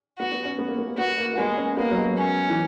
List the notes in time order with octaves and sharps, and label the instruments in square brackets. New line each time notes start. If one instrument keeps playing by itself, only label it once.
[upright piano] B3 [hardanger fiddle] F#4
[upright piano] B3
C#4
B3
A#3
B3
A#3
[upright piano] B3 [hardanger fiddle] F#4
[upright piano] A#3
A#3
[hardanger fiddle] G#3 [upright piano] B3
[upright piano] C#4
[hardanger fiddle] A#3 [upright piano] B3
[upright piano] F#3
G#3
[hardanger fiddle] C#4
[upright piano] E3